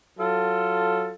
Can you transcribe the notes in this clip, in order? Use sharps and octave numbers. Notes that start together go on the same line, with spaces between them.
F#3 F4 A4